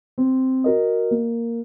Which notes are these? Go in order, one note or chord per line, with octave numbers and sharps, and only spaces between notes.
C4
F#4 A#4 D#5
A#3